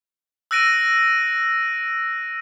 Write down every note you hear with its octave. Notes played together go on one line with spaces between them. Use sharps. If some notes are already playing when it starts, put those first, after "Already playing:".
E6 F#6 A#6 D7 D#7